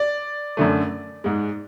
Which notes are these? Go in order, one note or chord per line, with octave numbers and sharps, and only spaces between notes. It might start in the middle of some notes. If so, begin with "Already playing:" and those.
Already playing: D5
F#2 D3 A3
G#2 G#3